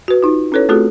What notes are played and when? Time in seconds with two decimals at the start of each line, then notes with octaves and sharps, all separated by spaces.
0.08 F#4 B4
0.23 D#4 F4
0.52 C#4 E4 A4 B4 C#5
0.69 A3 C4 F4 F#4 G#4 A4